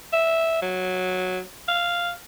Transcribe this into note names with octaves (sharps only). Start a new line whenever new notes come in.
E5
F#3
F5